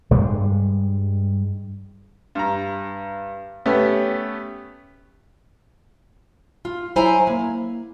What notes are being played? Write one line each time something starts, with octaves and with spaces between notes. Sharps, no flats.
G2 G3 G#3
G2 A#5
A3 B3 C#4 G4
F4
F#3 E4 C5 G#5 A#5
A#3